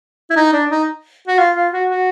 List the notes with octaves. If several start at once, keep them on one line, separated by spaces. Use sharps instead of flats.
E4
D#4
D4
D#4
F#4
F4
F4
F#4
F#4